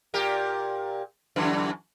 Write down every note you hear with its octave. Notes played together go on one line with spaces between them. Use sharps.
A#2 G4 A#4
F#2 D3 E3